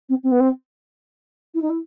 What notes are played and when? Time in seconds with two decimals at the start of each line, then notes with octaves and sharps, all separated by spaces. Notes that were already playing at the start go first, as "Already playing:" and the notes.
0.09 C4
0.23 C4
0.31 B3
0.40 C4
1.54 E4
1.62 D#4
1.70 E4